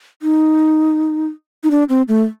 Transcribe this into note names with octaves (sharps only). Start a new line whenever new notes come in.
D#4
D#4
D4
C4
A3